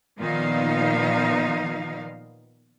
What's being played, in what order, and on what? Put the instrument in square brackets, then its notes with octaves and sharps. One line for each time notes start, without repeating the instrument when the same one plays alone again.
[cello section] A#2 D#3 F3 B3 D#4 F5